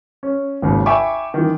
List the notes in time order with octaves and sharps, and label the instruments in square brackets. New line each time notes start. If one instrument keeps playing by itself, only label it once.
[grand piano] C#4
G#1 D#2 C#3
E5 G5 G#5 B5 C#6 D6
D#3 E3